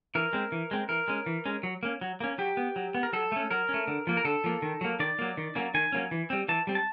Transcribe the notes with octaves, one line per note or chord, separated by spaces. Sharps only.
E3 A#4
G#3 C4
E3
G#3 C4
E3 A#4
G#3 C#4
E3
G#3 C#4
F#3
A#3 C#4
F#3
A#3 C#4
F#3 G4
B3
F#3
B3
A#4
F#3 A4
A3 C#4
F#3 A#4
A3 C#4
D3
F3 A#3
A#4
D3 A4
F3 A#3
D#3
F#3 A#3
D#3 D5
F#3 A#3
D#3
F#3 A#3 C#4
D#3 G#5
F#3 A#3 C#4
E3
G3 C4
E3 A5
G3 C4
A5